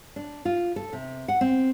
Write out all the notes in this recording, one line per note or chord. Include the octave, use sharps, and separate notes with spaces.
D4
F4
A4
C3
F#5
C4